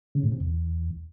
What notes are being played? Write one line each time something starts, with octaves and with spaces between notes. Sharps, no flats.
C#3
A2
C3
E2